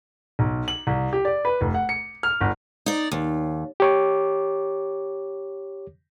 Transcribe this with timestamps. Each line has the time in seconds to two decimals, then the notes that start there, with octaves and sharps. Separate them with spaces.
0.39 B1
0.68 F#7
0.87 C2
1.13 G4
1.25 D5
1.45 B4
1.61 F1
1.74 F#5
1.89 C#7
2.23 F6
2.41 G1
2.86 D#4 D5
3.12 D#2
3.80 G4 C#5 D6